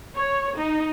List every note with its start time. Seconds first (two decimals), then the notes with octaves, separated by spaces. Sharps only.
0.16 C#5
0.56 D#4